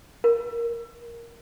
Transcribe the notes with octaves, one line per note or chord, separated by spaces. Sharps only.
A#4